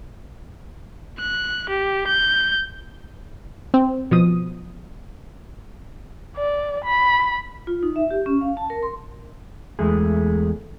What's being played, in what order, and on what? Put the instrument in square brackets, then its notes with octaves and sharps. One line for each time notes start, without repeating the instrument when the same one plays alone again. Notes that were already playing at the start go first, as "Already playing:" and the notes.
[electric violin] F#6
G4
G6
[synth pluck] C4
B2 F3 D#6
[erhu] D5
B5
[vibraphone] F4
D#4
E5
G4
C#4
F5
A5
A#4
C6
[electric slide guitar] E2 G#3 A3 G#4